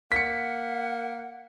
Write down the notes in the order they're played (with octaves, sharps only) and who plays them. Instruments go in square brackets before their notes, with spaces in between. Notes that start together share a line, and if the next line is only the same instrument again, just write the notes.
[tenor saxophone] A#3 [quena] F#5 [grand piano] B6 C#7